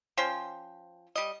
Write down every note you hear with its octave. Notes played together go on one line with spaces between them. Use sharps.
F3 C#4 C5 G5
G3 D#5